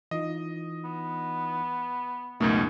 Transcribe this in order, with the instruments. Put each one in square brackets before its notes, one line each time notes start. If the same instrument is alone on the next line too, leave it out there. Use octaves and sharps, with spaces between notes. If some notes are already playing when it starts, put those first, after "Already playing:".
[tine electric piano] E3 D#4 F4 [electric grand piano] D#5
[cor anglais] B3
[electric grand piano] C#2 F#2 B2 [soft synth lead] A3 [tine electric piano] D#4 A#4